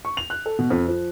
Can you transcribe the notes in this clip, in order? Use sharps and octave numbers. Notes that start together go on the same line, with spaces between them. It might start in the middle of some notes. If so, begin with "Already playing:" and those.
C#6
F7
F#6
A4
B2
F2
F3